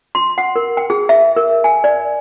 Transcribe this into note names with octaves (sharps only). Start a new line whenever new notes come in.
C6
F#5
A#4
G5
G#4
E5
A#4
G#5
D5